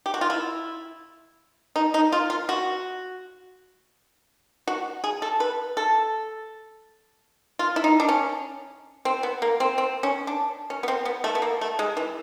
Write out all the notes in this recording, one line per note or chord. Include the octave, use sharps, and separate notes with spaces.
G4
F#4
F4
E4
D#4
D#4
F4
F4
F#4
F#4
G#4
A4
B4
A4
F4
E4
D#4
D4
C#4
C4
B3
A#3
C4
C4
C#4
D4
C#4
B3
C4
B3
A3
B3
A#3
A3
G#3
E3